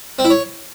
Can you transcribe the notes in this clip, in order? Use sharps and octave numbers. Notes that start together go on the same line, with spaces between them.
C4
E4
C#5